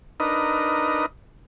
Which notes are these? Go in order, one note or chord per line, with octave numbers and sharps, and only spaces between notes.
D4 D#4 A#4 B4 D#5